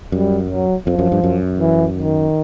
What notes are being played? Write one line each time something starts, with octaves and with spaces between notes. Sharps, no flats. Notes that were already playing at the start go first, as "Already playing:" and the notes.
F#2 G3
F#3
F2 F3
F#2
G2
F#2
E3
D#3